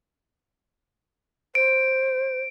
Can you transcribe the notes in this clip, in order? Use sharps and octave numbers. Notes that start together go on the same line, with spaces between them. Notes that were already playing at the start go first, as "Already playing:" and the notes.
C5 D7